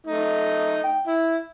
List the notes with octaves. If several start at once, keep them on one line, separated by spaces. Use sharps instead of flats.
A3 D#4
G5
E4